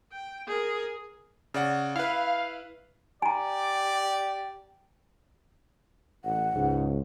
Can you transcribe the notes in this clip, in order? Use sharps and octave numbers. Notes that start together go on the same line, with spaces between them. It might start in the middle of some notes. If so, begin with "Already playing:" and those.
G5
G#4 A#4
C#3 D5 F#5
E4 B4 F5
G4 D5 G#5 A#5
A1 F#5
C#2 G#2